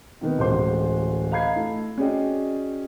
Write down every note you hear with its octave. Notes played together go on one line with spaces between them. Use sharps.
C3 D#3 B3
D1 A1 G#3 C5 C6
D#5 F5 A#5 B5 G#6 C7
A3 E4
C#4 F#4 G#4 D5 D#5 G5